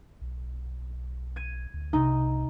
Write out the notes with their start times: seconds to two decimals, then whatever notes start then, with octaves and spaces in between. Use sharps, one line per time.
0.21 B1
1.36 G#6 D#7
1.74 D2
1.93 C2 C3 D#4